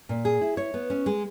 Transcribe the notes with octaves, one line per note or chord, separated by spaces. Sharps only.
A#2
G#4
E4
C#5
B3
C#4
G#3